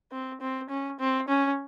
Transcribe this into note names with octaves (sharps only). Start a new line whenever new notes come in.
C4
C4
C#4
C4
C#4